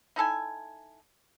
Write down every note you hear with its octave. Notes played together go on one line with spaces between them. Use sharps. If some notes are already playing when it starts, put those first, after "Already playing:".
D#4 E4 A4 G#5